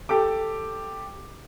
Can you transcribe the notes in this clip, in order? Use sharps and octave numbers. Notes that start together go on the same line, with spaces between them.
G4 A4 D6